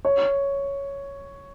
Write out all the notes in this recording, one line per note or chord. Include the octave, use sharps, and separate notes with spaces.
C#5